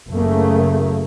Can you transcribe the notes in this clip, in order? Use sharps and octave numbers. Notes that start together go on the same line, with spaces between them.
F#1 C#3 A3 A#3